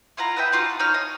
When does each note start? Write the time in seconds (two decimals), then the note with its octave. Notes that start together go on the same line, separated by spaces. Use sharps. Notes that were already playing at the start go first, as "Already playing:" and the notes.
0.17 E4 F4 F#5 A#5
0.36 B4 D#5 E5 G5
0.52 D#4 F4 F#4
0.65 A5
0.80 D#4 C#5 F6
0.94 D#5